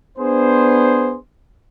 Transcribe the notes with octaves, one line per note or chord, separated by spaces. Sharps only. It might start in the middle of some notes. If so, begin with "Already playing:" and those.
B3 D4 G#4 C5